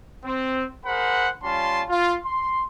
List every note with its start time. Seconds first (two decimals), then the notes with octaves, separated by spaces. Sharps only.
0.24 C4
0.85 G#4 A#4 C5 F#5 B5
1.42 G3 C#4 F4 A5 C6
1.89 F4
2.24 C6